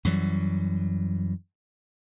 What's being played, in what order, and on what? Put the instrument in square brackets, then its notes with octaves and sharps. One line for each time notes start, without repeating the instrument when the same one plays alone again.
[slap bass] F#2 E3 F#3 G3